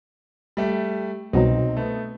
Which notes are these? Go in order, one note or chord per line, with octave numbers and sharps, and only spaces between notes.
G3 A3
C2 B2 F#3 C4 D#4
A3 B3